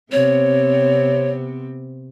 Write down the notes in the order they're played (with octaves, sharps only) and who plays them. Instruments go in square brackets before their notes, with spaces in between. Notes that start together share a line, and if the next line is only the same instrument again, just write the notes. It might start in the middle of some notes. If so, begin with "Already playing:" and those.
[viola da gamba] C3 B3 C4 [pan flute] C#5